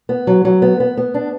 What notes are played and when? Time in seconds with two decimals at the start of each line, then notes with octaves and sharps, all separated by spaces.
0.09 B3
0.27 F#3
0.45 F#3
0.62 B3
0.80 B3
0.97 B3
1.14 D4